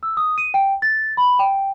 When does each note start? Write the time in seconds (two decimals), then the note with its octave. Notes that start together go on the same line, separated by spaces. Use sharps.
0.03 E6
0.17 D#6
0.38 D#7
0.54 G5
0.82 A6
1.17 B5
1.39 G5